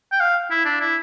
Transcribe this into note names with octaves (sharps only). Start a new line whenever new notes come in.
G5
F5
E4
D4
E4